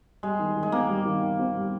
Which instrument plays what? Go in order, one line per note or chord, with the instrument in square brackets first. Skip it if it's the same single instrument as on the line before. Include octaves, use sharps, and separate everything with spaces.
[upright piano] G3 [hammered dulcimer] G#3
[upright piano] D#3
D#3
[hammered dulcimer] G#3
[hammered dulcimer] A#3 [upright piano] C4
[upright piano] G3
D#3
D#3
C4
G3